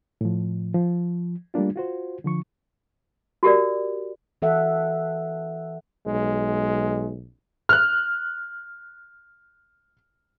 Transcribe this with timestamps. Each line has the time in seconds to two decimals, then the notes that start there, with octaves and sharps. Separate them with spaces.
0.21 A2 F3
0.74 F3
1.54 G3 A3 A#3 D4 F4
1.76 F4 F#4 C5
2.24 D3 F3 C#6
3.43 F#4 G4 A#4 D5
4.42 E3 A4 E5 F#5
6.06 B1 G#3
7.69 F6 F#6